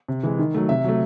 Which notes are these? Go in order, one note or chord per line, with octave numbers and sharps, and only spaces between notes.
C3
E3 G#3
D#3
F#3 A3
C3 E5
F#3 A3